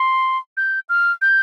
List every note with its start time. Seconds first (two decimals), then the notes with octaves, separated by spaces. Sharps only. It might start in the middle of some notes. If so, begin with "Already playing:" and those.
Already playing: C6
0.57 G6
0.89 F6
1.21 G6